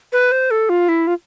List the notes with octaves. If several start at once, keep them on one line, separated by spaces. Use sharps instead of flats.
B4
C5
A4
F4
E4
F4